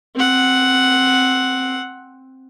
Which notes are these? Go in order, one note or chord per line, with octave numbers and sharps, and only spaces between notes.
C4 F#5